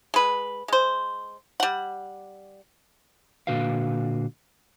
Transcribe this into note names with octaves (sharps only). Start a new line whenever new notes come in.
G#3 B4
G#3 C5
G3 F#5
A#2 D3 F#4 B4 F5